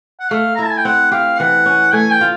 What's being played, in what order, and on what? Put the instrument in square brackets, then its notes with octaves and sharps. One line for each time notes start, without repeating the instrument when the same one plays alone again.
[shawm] F#5
[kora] A3 [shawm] F5
[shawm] A#5
[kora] E4 [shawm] A5
[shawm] G#5
G5
[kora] C4 [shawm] F#5
[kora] G4 [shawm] F5
[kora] E3 [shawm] F#5
[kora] C#4
[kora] A3 [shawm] G#5
[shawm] G5
[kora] F4